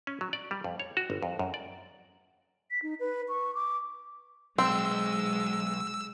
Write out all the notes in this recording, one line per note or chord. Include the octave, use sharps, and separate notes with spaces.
C#4
F#3
D5
G3
F2
C#5
F#4
G1
F2
F#2
D5
B6
D#4
B4
C#6
D6
B1 G#3 C4 E6